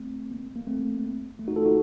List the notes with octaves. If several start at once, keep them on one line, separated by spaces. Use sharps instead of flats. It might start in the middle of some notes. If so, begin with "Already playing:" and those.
Already playing: A3 C4
A#3
A#3
A3 C4
A3
D#4 F#4
F4 A4
D#4 F#4